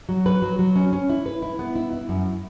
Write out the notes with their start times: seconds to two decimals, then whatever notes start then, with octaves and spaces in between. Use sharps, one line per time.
0.09 F#3
0.26 B4
0.42 F#3
0.59 F#3
0.76 C#4
0.93 C#4
1.09 E4
1.26 B4
1.42 E4
1.59 B3
1.76 E4
1.93 E4
2.09 F#2